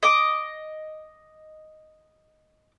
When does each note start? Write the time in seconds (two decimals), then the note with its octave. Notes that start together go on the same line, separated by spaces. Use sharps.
0.03 D#5 D6